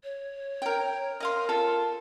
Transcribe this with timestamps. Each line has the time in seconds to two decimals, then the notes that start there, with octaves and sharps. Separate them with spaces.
0.04 C#5
0.62 A#4 G5
1.20 A#4 D#5 F5 C6
1.49 F4 A4